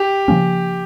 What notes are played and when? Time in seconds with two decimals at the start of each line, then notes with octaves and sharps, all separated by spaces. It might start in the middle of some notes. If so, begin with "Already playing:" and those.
Already playing: G4
0.28 C#3 F3 A#3 C#4